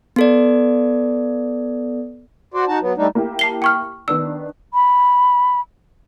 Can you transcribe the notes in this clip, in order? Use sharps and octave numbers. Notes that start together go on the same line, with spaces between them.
B3 A4 D5
F#4 C5 D5
D#4 F#4 A5
F#3 B3
G3 A3 D4 D#4
A#3 E4 G4
A5 C7 G7
G5 C#6 F6
D#3 B3 D4 E6
B5